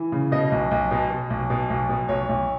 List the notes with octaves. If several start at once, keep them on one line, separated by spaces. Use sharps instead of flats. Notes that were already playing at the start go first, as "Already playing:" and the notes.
Already playing: E3
C#3
B2 D#5
B1
B1
B2
B2
B1
B2
B1
B2
B1 C#5
B1